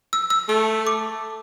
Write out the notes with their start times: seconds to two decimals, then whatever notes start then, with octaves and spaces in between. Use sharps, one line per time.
0.13 E6
0.30 E6
0.49 A3 E6
0.87 D6